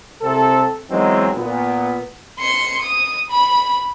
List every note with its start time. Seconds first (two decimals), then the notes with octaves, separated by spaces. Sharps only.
0.22 C2 C3 C4 A4
0.89 E3 F#3 G#3 B3 C4 D#4
1.35 A#2 B3
2.39 C6 C#7
2.82 D#6
3.30 B5